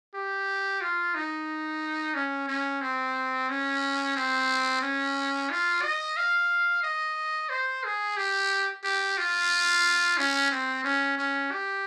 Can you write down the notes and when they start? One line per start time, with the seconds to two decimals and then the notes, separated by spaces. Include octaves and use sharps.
0.15 G4
0.81 F4
1.15 D#4
2.15 C#4
2.48 C#4
2.81 C4
3.49 C#4
4.16 C4
4.82 C#4
5.50 F4
5.82 D#5
6.17 F5
6.83 D#5
7.50 C5
7.84 G#4
8.17 G4
8.84 G4
9.18 F4
10.17 C#4
10.51 C4
10.84 C#4
11.18 C#4
11.51 G4